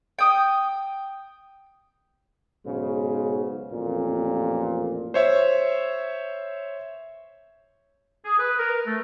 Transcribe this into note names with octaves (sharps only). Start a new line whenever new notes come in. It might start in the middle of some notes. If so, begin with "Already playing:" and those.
G5 D#6
B1 G#2 C#3
A1 F2 A#2
C5 C#5 E5
G#4
B4
A#4
A3